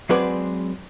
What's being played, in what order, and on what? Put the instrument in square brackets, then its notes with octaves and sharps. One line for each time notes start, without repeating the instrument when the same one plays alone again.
[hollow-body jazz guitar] F#3 G#3 C4 G#4 B4 D5